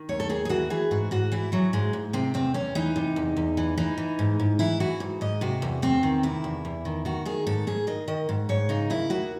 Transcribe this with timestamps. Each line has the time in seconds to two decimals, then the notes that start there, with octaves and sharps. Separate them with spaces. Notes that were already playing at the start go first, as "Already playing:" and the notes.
Already playing: D#3
0.09 D#2 C#5
0.20 A4
0.29 D#2 G#4
0.45 G#4
0.49 E3 F#4
0.70 E3 G#4
0.91 G#2 F#4
1.11 G#2 F#4
1.32 E3 E4
1.52 E3 F#3
1.73 G#2 G#3
1.93 G#2
2.13 C3 C4
2.34 E2 C4
2.54 E2 C#4
2.75 E3 D#4
2.96 C3
3.16 E2
3.37 E2
3.57 E3
3.78 E3 D#4
3.98 E3
4.19 G#2
4.40 G#2
4.59 E3 E4
4.80 E3 F#4
5.00 G#2
5.21 G#2 D#5
5.41 C3 F#4
5.62 E2
5.82 E2 C4
6.03 D#3
6.23 C3 E4
6.44 E2
6.65 E2
6.85 D#3
7.05 D#3 F#4
7.25 D#3 G#4
7.47 G#2 A4
7.67 G#2 G#4
7.87 D#3 D#5
8.08 D#3 D#5
8.29 G#2
8.49 G#2 C#5
8.69 C#3 D#4
8.90 D#2 E4
9.10 D#2 F#4